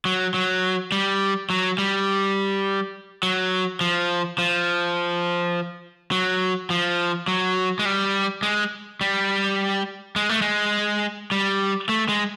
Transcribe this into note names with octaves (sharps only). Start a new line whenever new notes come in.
F#3
F#3
G3
F#3
G3
F#3
F3
F3
F#3
F3
F#3
G#3
G3
G#3
G3
G#3
A3
G#3
G3
A3
G#3